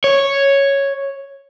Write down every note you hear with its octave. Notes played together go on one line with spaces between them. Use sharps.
C#5